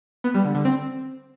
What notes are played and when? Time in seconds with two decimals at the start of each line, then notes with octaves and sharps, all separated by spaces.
0.24 B3
0.34 G3
0.45 D3
0.55 D3
0.65 C4